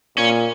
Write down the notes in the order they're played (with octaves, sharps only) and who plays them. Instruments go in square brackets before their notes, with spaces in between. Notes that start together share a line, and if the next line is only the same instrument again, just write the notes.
[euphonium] A#2 [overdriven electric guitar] C#4